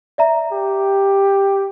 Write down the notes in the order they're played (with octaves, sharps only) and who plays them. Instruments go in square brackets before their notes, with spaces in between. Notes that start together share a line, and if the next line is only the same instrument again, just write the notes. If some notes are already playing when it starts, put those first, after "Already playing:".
[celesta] D5 E5 A#5
[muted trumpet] G4